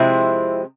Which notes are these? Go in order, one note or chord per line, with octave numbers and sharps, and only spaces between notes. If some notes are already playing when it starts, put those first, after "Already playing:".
Already playing: C3 F3 G#3 C4 E4